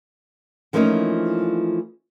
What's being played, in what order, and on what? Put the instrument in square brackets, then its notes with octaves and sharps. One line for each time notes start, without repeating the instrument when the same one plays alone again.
[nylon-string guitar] E3 F3 A3 A#3 C#4 D#4